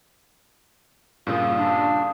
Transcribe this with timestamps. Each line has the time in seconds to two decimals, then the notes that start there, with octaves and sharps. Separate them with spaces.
1.27 G2 A#2 C#3 F4 F5 D#6
1.57 D4